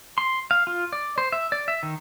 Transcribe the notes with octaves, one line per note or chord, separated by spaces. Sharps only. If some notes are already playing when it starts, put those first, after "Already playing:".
C6
F5
F4
D5
C5
E5
D5
E5
D#3